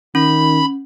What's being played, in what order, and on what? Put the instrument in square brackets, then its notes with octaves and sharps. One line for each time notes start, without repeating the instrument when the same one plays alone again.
[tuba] D#3 [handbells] C#4 [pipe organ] B5